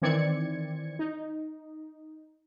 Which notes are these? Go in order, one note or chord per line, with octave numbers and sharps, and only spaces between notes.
D#3 E3 C4 D5 G#6 C#7
D#4